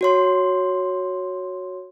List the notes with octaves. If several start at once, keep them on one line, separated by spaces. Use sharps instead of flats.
F#4 C#5 C6